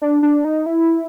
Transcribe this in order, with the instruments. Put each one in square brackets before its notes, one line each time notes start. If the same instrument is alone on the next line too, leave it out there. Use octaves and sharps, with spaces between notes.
[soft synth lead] D4
D4
D#4
E4